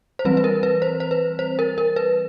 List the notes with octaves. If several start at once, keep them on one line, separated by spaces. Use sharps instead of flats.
C5
E3 G3 C4 B4
B4
A#4
B4
C5
C5
B4
C5
A#4
A#4
B4